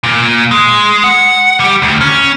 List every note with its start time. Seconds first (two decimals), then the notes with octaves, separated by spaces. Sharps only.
0.03 A#2
0.51 G#3
1.04 F#5
1.60 G3 G4
1.82 D2
2.01 C#4